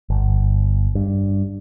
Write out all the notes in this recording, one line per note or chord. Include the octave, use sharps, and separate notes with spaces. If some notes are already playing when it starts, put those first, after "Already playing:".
G1
G2